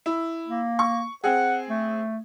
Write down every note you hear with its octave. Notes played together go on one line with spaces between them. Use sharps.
E4
A#3
C#6
C4 G#4 F#5
A3